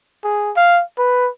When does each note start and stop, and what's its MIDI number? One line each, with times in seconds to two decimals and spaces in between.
0.24 0.51 68
0.56 0.82 77
0.98 1.29 71